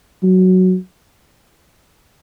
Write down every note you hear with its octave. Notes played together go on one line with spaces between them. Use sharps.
F#3